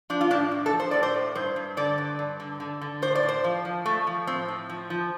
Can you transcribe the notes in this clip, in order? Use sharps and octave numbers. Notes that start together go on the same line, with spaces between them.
F3 D4
F4
A2 D4
A2
A4
F3
C5
A2 D5
C5
A2
G2 C5
G2
D3 D5
G2
G2
D3
D3
D3
A2 C5
D5
A2
C5
F3
F3
F3 A3
F3
A2 C4
A2
F3
F3